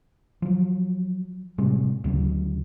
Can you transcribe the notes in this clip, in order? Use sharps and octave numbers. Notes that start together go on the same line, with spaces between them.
F3 F#3
A2 C3 G3 G#3
D2 C#3 E3 F#3